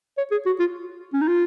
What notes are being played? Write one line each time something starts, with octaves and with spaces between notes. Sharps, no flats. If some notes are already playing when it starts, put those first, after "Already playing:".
C#5
G#4
F#4
F4
C#4
D#4
F4